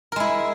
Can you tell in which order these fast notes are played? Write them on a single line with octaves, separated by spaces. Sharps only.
A#4 G#3 E4